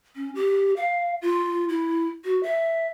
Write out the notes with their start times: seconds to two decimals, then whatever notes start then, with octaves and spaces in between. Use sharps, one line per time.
0.16 C#4
0.35 G4
0.77 F5
1.22 F4
1.69 E4
2.24 F#4
2.43 E5